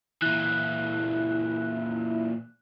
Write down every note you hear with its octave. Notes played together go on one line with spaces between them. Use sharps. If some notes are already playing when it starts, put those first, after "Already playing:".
A#2 E3 E4 F#6